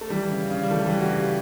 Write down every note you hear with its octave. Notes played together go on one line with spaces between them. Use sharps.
A3
E3 G3
C#3
C#3
G3
E3 A3
E3 G3
F#4
C#3 G4